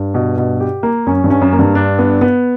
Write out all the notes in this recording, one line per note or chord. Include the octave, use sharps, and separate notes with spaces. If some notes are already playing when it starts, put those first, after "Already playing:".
Already playing: G2
B2
B2
G4
A#3
F#2 C#4
G2
C#4
F#2
A#3
G2
D4
B3
B3